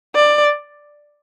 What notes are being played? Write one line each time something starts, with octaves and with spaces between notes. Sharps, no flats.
D5